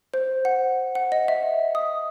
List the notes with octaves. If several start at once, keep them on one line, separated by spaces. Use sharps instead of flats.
C5
F#5
F#5
D#5
E5
D#6